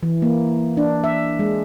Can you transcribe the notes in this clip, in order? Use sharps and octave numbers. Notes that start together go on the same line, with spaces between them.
E3
A#3
D4
E5
G#3